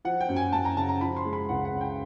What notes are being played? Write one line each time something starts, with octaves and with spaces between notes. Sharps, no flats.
F3 F#5
G5
F#2
G#5
F#2 A5
A#5
C#3 A5
A#5
F3 B5
C6
G#3
B5
C#2 F#5
F#5
C#3
G5